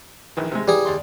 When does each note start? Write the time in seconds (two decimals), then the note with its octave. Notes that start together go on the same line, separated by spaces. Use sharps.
0.37 A#1 D#3 E3
0.52 C3 G#3
0.68 E3 G3 G#4
0.85 D#2 D5 C6